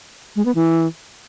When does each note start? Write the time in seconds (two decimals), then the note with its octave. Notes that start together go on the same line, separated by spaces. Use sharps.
0.36 G#3
0.45 B3
0.55 E3